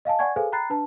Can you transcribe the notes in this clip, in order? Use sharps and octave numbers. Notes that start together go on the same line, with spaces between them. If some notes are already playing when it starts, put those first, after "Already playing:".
D#5 F5 G#5 A5
D5 F#5 G#5 C#6 G#6
G#4 A4 B4 C5 F5 G#5
G5 A#5 B5 F#6 A6 C7
D4 B4 A5